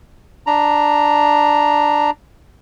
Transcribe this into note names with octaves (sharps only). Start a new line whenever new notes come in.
D4 A#5